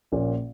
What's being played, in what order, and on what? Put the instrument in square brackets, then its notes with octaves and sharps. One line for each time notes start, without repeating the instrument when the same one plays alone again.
[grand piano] A#1 A#2 A#3 C#4